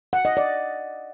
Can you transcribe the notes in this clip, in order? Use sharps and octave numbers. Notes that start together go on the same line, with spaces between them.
F#5
D#5
D5